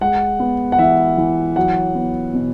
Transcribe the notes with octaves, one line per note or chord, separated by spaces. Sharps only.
G#3 F#5
B3
F#5
E3 E5
E3
F#3 F#5
B3
B2